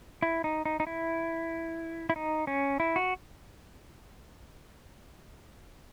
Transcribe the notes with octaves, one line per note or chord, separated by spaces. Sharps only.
E4
D#4
D#4
D#4
E4
E4
D#4
C#4
E4
F#4